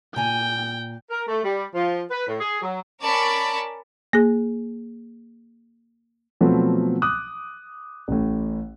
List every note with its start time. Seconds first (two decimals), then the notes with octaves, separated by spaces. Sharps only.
0.16 A#2 G5 G#5 A#5
1.10 A#4
1.28 A3
1.44 G3
1.74 F3
2.10 B4
2.27 A2
2.40 G#4
2.62 F#3
3.03 C#4 A#4 D5 A5 B5 C#6
4.13 A#3 G#4
6.41 B2 F3 F#3 A3 B3 C4
7.02 D6 D#6 F#6
8.08 A1 A2